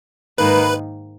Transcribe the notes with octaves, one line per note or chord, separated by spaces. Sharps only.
G#2 D#3 A#3 D#4 B4